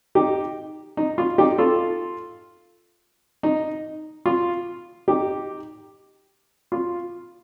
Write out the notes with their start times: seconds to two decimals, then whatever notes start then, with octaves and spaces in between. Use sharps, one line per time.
0.15 D#4 G4
0.97 D#4
1.18 F4
1.38 D#4 G4
1.58 F4 A4
3.43 D#4
4.26 F4
5.08 D#4 G4
6.72 F4